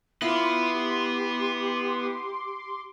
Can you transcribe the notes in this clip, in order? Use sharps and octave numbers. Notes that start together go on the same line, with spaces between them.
B3 E4 F4 C6 D6
G4